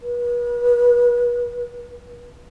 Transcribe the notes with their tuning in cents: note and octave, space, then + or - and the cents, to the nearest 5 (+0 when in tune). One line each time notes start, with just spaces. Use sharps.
B4 -40